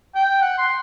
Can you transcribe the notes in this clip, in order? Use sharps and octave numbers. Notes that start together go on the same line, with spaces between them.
G5
F#5
C6